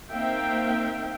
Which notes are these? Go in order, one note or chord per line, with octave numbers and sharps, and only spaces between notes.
A#3 C4 D#4 E5 F5 G5